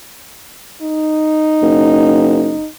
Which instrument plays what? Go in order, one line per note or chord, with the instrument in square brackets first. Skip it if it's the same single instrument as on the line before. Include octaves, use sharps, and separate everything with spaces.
[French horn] D#4
[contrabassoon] F#1